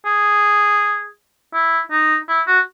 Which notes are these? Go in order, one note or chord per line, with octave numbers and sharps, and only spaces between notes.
G#4
E4
D#4
E4
F#4